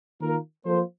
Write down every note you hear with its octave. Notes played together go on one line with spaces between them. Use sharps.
D#3 A#3 F4 A#4
F3 A#3 F4 A4 C5